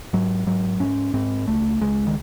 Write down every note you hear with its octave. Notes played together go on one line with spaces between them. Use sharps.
G#2 F#3
G#2 F#3
G#2 C#4
G#2 C4
C#2 A3
C#2 G#3
D#3